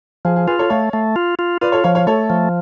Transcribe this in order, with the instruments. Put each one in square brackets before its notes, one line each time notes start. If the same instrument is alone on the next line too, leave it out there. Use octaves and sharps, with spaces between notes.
[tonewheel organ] F3 [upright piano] G#4
[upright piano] G#4
[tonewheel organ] F4 [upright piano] G#4 B4
[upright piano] A4 C#5
[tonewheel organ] A3 [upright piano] C#5 F5
[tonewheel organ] A3
F4
F4
[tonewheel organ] F4 [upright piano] B4 D5
[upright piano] A4 C#5
[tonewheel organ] F3 [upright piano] C#5 F5
[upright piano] C#5 F5
[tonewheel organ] A3 [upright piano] A4 C#5
[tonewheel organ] F3